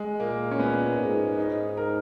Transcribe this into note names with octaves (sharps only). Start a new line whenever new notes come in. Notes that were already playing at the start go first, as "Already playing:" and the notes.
Already playing: G#3
A#2 A#3
C#4
A#2 B3
G#2
D#4
A#4